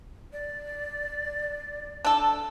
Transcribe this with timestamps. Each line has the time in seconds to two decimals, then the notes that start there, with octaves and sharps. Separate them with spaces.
0.33 D5
2.05 D4 A4